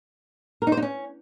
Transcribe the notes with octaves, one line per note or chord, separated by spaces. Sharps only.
A#4
D#4
C5
D#4
C#4